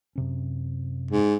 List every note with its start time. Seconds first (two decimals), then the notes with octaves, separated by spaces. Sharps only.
0.15 F#2 C3 C#4
1.11 G#2